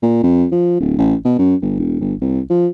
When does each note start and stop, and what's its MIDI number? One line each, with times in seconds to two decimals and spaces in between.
0.03 0.22 46
0.23 0.46 41
0.52 0.76 53
0.80 0.98 26
0.98 1.15 33
1.25 1.38 47
1.38 1.55 42
1.62 1.76 31
1.79 1.97 28
2.00 2.15 31
2.21 2.40 36
2.50 2.68 53